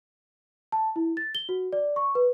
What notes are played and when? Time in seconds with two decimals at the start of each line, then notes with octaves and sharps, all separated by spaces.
0.72 A5
0.96 E4
1.17 A6
1.35 G7
1.49 F#4
1.73 D5
1.96 C#6
2.15 B4